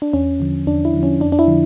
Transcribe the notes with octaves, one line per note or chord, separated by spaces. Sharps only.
D4
E2 C#4
D3 F3
E2 D4
E4
D3 F3
C#4
F2 D4
D4
E4
D3 F3